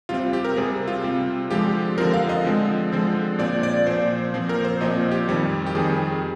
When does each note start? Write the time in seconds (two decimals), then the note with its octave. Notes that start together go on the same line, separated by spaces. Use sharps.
0.09 C3 G3 C4 F4
0.33 G4
0.45 A#4
0.56 C3 G3 C4 G#4
0.87 F4
1.04 C3 G3 C4
1.50 D3 F3 G#3 C4 G4
1.98 D3 F3 G#3 C4 A#4
2.13 F5
2.29 D#5
2.44 D3 F3 G#3 C4
2.92 D3 F3 G#3 C4
3.39 A#2 F3 C4 D5
3.63 D5
3.86 A#2 F3 C4 C5
4.34 A#2 F3 C4
4.49 A#4
4.65 C5
4.81 A#2 F3 C4 D#5
5.11 G4
5.28 F2 D#3 G3 C4
5.66 G4
5.75 F2 D#3 G3 C4 G#4